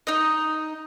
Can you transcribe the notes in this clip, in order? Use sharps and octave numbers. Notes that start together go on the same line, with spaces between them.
D#4 D#5